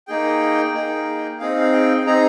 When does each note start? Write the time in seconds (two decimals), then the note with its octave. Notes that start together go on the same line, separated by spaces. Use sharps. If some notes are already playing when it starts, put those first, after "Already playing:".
0.07 A#3 D#4 G#4 G5
0.74 A#3 D#4 G#4
1.40 C4 D#4 G#4 F5
1.61 F5
1.73 G5
2.06 C4 D#4 G#4 A#5